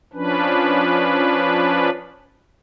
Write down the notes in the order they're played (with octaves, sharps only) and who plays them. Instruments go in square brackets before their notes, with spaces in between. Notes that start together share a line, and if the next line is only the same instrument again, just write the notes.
[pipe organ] F3 C#4 D4 B4